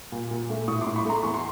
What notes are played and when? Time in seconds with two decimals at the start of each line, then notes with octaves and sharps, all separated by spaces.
0.12 A#2
0.31 A#2
0.50 A3
0.68 A2 C#6 D#6
0.81 C6 D6
0.87 A2
0.96 B5 C#6
1.05 A3 A#5 C6
1.23 E2 C#6
1.34 C6